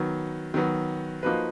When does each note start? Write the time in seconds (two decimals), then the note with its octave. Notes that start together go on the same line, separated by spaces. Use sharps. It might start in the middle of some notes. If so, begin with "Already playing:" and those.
Already playing: D#3 F#3 B3
0.54 D#3 F#3 B3
1.23 F3 A#3 D#4 F#4 B4